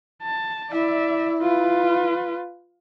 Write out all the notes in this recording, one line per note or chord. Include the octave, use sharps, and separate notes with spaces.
A5
E4 D5 E5
F4 B4